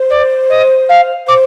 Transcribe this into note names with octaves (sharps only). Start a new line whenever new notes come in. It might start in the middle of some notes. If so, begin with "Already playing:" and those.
Already playing: C5
D5
D#5
F5
C5 D6